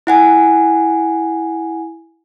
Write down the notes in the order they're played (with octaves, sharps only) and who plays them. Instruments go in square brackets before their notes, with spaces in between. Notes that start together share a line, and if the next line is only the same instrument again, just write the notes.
[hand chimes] E4 F#5 G#5